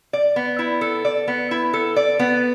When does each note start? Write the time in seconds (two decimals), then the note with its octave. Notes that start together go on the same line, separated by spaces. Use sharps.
0.13 D5
0.36 B3
0.59 E4
0.81 A4
1.05 D5
1.28 B3
1.51 E4
1.73 A4
1.96 D5
2.19 B3